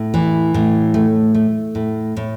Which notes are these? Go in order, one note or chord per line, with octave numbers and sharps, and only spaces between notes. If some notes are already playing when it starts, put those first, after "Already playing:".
Already playing: A2
E3
A2
A3
A3
A2
A2